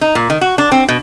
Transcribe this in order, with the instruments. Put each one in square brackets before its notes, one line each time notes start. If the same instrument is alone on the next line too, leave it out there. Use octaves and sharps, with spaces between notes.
[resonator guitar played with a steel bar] D#4
A#2
D#3
F#4
D4
C4
B2